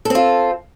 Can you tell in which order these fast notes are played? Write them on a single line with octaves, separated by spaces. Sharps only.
A4 C4 F4